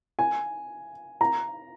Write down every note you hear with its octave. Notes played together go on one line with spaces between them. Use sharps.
G#5
A#5